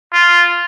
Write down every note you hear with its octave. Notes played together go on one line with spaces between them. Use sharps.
F4